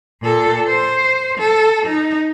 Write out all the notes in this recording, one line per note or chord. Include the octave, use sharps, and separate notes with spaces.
A#2 A4
C5
A4
D#4